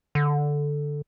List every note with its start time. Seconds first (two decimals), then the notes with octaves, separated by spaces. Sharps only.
0.15 D3